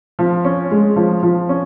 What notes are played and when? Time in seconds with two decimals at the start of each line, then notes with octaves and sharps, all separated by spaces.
0.19 F3
0.45 C#4
0.71 G#3
0.96 F3
1.23 F3
1.49 C#4